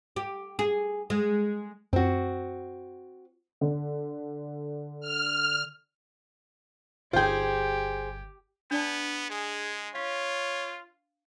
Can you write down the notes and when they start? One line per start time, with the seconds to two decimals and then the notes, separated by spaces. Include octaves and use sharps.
0.16 G4
0.59 G#4
1.10 G#3
1.93 F#2 C4 F#4
3.61 D3
5.01 F6
7.13 G1 F4 G4 G#4 C5 G5 G#6
8.71 B3 D4 D5 A5
9.30 G#3 G#4
9.95 F4 C#5 F5